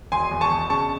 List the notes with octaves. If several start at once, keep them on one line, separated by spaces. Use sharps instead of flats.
E1 G#5 C6
E2
A5 C#6
E1
C#3 A5 C#6